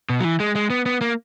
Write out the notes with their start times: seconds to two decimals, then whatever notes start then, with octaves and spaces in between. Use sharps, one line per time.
0.09 B2
0.20 F#3
0.24 E3
0.40 G#3
0.55 G#3
0.70 B3
0.86 B3
1.01 A#3